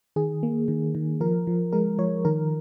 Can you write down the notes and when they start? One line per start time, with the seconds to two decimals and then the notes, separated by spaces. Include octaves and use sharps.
0.16 D#3 G#4
0.43 A#3
0.68 D#3
0.95 D#3
1.21 F3 A#4
1.47 F3
1.73 G#3 A#4
1.99 F3 C#5
2.25 D#3 A#4